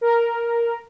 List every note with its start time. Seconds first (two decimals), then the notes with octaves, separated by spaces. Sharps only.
0.01 A#4